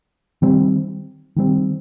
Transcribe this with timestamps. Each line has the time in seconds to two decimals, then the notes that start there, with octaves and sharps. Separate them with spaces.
0.42 D#3 G3 C4
1.36 D#3 G3 C4